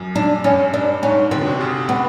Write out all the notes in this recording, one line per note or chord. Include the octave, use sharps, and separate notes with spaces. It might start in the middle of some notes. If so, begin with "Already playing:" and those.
Already playing: F#2
D4
G2 C#4
D4
G#2 C#4
D3 C4
B2
C3
C#3
B3